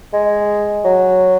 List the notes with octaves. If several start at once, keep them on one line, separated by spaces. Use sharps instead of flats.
G#3
F#3